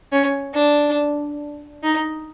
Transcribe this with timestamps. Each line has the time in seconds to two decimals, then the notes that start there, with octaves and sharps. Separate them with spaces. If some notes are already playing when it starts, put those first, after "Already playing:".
0.12 C#4
0.54 D4
1.83 D#4